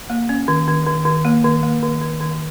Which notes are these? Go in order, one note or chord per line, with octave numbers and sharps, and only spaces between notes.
A#3
C#4
D#3
D#3
D#3
D#3
A#3
D#3
A#3
D#3
D#3
D#3